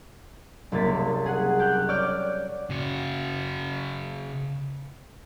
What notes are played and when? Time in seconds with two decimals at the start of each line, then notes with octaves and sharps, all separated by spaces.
0.72 F#1 C2 A#3 A6 B6
1.26 G#4 F#5
1.59 G4 G5 F#6
1.88 C#5 D5 D6 F6 G6
2.70 C#3 F#4